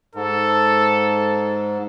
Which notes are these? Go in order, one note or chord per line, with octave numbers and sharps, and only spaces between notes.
G#2 A4